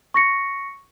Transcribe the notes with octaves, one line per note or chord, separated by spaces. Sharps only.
C#6 A#6 C#7